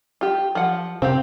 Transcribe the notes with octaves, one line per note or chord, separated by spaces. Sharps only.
F4 G4
F3 F#5
C3 C4 G4 C5 F5